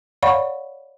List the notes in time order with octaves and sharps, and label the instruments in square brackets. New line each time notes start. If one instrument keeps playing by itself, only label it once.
[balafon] C#5 D5 F5 F#5 B5 C#6